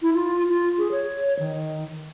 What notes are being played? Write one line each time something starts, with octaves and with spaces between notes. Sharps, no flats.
E4
F4
F4
G#4
C#5
D#3